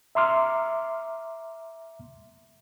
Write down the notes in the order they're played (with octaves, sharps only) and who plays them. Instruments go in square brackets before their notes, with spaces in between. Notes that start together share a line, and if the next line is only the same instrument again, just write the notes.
[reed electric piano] E5 A#5 C6 D6 F6